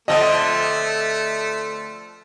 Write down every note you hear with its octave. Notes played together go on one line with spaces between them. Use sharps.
D3 F3 A3 C4 D#5 A5